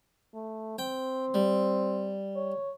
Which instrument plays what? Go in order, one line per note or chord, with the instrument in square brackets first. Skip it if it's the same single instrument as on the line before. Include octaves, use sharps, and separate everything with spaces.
[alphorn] A3
[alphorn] C4 [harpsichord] G5
[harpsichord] G3
[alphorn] C#5